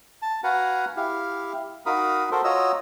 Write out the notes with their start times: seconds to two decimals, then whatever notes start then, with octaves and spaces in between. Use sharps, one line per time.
0.22 A5
0.44 F#4 B4 F5 F#5 G#5 A#5
0.96 E4 G4 F5
1.86 D#4 F#4 A#4 F5 B5 D#6
2.31 F#4 A4 A#4 C5
2.44 F4 F#4 C#5 D#5 A#5 E6